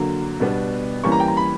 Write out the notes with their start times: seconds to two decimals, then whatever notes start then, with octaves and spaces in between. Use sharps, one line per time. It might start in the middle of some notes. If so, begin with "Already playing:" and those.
Already playing: D3 F#3 A#3
0.40 B2 G3 B3 D4
1.04 E3 G3 A#3 C#4 C#6
1.12 A#5
1.20 G5
1.28 A#5
1.37 B5